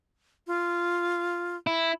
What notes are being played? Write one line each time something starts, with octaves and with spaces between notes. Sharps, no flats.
F4
E4